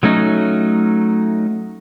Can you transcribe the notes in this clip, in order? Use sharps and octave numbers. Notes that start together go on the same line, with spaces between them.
F#3 A3 C#4 D#4